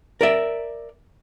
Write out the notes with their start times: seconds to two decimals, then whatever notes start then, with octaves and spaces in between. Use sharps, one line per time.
0.21 A#4 D5 E5